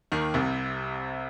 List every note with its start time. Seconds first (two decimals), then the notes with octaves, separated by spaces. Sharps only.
0.12 D#2 D#3
0.34 C2 C3